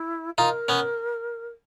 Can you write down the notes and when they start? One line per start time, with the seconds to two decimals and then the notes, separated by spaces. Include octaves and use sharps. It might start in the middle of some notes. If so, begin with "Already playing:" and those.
Already playing: E4
0.38 D#4 F4 A#4
0.68 B3 C#4